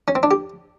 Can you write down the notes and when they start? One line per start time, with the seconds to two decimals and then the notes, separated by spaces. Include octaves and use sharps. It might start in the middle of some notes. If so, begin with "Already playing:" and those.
0.08 C#4
0.15 C4
0.23 D4
0.31 G4